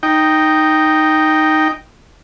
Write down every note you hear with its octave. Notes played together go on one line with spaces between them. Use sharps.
D#4 G5